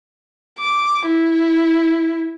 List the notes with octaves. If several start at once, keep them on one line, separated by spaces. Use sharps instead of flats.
D6
E4